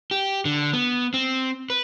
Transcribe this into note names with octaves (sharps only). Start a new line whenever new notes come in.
G4
D3
B3
C4
B4